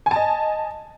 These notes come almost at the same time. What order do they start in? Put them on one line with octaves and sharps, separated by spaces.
G#5 A5 D#5